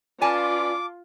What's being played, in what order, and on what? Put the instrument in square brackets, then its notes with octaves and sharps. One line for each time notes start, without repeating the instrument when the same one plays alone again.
[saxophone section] C#4 B4 D5 [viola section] F4 [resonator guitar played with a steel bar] G#5 A5 [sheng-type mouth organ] D6